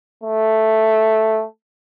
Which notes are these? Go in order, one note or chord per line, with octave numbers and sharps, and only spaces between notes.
A3